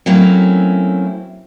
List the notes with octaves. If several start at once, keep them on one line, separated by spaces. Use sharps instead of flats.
F#3 A3 A#3 C4 C#4 E4